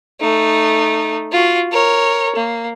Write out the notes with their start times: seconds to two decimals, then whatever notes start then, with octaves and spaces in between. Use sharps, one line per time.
0.21 A3 D#4
1.32 F4 F#4
1.72 A#4 C#5
2.35 A#3